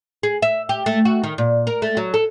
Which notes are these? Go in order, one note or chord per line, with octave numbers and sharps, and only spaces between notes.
G#4
E5
G4
A3
F#4
D#3
A#2
A#4
A3
F#3
A4